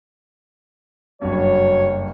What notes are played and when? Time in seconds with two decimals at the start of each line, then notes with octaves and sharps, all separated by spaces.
1.22 F#1 G2 F#3 C#5